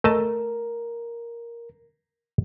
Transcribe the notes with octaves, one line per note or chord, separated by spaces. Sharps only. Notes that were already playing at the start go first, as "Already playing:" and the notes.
A3 A#4 D#5 A5